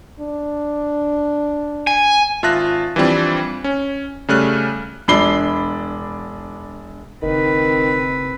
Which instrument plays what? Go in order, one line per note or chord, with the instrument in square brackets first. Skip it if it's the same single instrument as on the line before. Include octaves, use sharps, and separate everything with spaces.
[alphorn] D4
[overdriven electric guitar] G#5
[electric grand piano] G#1 F4 E5 A5 F#6 A#6
E3 F3 G3 C4 D4
C#4
C#3 G3 A3 C#4 F6 F#6
[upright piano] E1 D4 B5 C7 G7
[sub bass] F#1 [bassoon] D#3 [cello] C4 B4